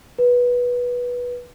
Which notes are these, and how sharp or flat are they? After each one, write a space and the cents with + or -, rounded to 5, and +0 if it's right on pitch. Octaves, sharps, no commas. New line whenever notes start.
B4 -15